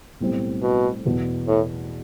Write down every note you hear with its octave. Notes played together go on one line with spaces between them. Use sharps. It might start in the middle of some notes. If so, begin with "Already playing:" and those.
B1 A2 G3 C4
B2
E2 B2 B3
A2